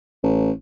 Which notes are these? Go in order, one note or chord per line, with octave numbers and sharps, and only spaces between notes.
A1